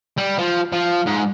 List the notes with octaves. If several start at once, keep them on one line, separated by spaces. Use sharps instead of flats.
G3
F3
F3
G#2